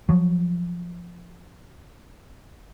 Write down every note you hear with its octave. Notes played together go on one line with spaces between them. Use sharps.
F3 F#3